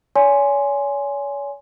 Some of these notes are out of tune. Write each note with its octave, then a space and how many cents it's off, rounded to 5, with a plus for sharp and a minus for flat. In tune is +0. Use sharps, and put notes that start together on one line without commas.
C#5 +40 G#5 +0 C6 +0